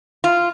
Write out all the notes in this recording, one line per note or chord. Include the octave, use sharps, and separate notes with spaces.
F4